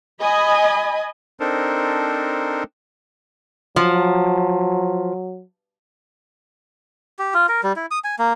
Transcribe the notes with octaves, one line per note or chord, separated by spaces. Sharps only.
D#5 G#5 B5
C4 D4 D#4 A4 A#4 C5
F3 F#3
G4
F4
A#4
G3
E4
D#6
G#5
A#3